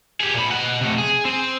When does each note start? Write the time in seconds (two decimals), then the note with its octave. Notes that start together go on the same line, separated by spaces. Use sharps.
0.21 G4 G#4
0.34 A#2 B5
0.51 D#5 F#5
0.81 C3 A3
0.98 G#4
1.25 C4